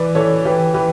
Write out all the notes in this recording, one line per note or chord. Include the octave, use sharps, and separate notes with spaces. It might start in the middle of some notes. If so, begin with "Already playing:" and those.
Already playing: E3 B4 D5
E3 A4 C#5
E3 G4 B4
E3 G4 B4